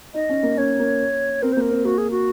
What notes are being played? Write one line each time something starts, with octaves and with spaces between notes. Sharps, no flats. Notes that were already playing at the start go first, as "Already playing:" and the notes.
D#4 D#5
C#4
A#3
C#4 C#5
A#3
C4 A#4
A#3 C5
A#4
C4
A#3 F#4
G#4
F#4